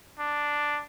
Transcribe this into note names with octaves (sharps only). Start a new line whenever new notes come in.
D4